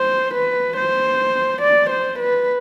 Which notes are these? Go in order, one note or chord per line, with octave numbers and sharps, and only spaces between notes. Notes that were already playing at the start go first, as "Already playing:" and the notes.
Already playing: C5
B4
C5
D5
C5
B4